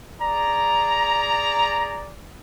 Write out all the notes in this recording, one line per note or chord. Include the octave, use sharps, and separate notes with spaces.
G#4 D5 A#5